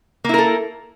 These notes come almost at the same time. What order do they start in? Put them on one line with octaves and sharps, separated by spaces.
A#3 E4 A#4 A4